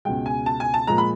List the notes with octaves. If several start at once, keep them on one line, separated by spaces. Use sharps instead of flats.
C#2 B2 G#3 G5
G#5
A5
G#5
A5
A#2 F3 G#3 A#5
B5